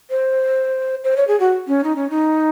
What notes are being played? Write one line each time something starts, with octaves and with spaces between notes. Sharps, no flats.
C5
C5
C#5
G#4
F#4
C#4
D#4
C#4
D#4